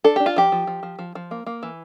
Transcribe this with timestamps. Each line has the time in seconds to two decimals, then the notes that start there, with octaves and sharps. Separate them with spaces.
0.04 D4 A4
0.16 D4 G4
0.26 F4
0.36 F3 G4
0.52 F3
0.67 F3
0.83 F3
0.99 F3
1.15 F3
1.31 A#3
1.46 A#3
1.63 E3